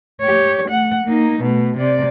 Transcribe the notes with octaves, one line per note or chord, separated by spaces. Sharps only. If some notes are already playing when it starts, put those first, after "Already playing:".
G4 C#5
A3 F#5
A#3 D#4
B2 A3
C3 D5